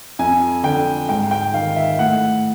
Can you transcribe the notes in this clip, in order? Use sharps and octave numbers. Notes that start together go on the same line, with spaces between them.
F2 G#5
D3 G5
G#2 G5
G5
D#3 F5
E5
A2 F#5